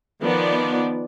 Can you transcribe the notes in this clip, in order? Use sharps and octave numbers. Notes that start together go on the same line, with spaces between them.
D#3 F3 B3 D5